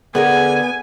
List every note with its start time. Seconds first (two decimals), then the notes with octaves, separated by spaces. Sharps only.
0.15 D3 B3 G#4 A#4 F#5 G#5